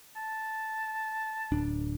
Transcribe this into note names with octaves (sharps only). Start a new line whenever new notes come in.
A5
D1 D4